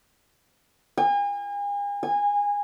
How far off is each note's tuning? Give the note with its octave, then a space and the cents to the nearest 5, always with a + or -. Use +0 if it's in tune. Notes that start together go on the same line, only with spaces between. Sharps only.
G#5 -40
G#5 -20